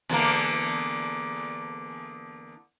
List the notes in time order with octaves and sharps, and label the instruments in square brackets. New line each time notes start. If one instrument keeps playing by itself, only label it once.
[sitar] E2 D3 A#3